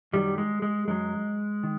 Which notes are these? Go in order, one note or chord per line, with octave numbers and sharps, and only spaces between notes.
F#2 D#3 F#3 G3
G#3
G#3
F#2 D#3 F#3 G#3
D#3